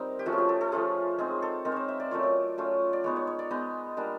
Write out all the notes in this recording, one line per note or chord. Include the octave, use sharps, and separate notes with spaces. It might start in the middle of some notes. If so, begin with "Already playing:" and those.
Already playing: G3 C4 D#4 A#4
G4
F3 A3 C#4 F4 F#4
G#4
G4
A4
A4
F3 A3 C#4 F4 G#4
G#3 C4 D#4 G#4
A4
G#3 C4 D#4 A#4
C5 C#5
E5
D5
F#3 A3 C#4 F4 C#5
D5
F#3 A3 C#4 F4
D5
G#3 B3 D#4 C#5
C#5
C#5
D5
G#3 B3 D#4 D#5
G3 A#3 D4